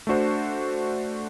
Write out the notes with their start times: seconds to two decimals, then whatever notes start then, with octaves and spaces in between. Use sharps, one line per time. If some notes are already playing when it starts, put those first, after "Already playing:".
0.07 A3 D4 F#4 C5